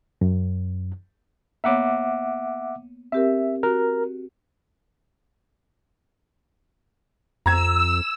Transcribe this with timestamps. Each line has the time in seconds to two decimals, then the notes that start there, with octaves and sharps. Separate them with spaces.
0.21 F#2
1.64 A#3 B3 C#5 E5 F#5 D6
3.12 C4 G4 A#4 E5
3.63 F#4 A#4
7.46 F2 A#5 E6 G#6